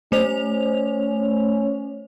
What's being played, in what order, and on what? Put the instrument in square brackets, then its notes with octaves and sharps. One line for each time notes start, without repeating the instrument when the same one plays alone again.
[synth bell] A3 C5 F7 [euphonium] C#4